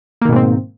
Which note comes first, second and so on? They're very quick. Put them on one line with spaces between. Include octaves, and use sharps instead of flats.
A#3 D#3 B2 G#2 C4